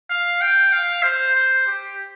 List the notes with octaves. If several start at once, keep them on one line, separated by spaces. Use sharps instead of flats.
F5
G5
F5
C5
C5
G4